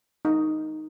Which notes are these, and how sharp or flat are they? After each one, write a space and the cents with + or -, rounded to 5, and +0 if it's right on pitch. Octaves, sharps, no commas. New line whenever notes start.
D#4 +0